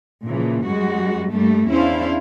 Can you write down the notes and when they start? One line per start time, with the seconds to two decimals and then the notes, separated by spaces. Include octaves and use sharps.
0.25 A#2 C#3 E3 F3
0.64 F#2 G3 G#3 F#4
1.32 G2 G3 A3 A#3
1.69 E2 C#4 D4 E4 C5 F5